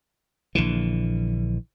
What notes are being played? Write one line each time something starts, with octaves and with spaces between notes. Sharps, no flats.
A#1 D3 E3